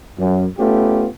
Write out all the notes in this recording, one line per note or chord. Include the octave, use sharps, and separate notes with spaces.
F#2
A3 B3 C#4 F4 G4